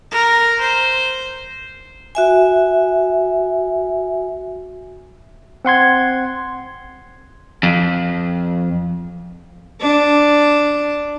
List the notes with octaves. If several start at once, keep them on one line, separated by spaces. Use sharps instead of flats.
A#4
C5
F#4 E5 G#5
C4 F#5 C6 G#6
F2
D4